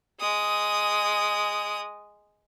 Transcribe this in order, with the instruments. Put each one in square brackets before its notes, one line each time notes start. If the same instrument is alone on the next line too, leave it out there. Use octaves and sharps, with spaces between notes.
[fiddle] G#3 D#6